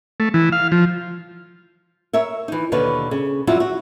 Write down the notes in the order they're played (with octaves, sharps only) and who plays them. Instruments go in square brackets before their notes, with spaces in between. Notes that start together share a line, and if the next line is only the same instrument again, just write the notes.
[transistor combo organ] A3
E3
F5
F3
[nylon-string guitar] A#4 C#5 E5
E3 D#4
D#2 B2 D3 B4 C#5
C#3
F2 F#3 G3 E4 F4
F#4